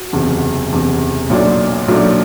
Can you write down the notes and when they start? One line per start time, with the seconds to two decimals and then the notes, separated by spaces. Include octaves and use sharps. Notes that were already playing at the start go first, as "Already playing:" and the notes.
Already playing: F#4
0.13 F#1 E2 C3
0.71 F#1 E2 C3
1.30 B1 A#2 F#3 A3 D4
1.88 B1 A#2 F#3 A3 D4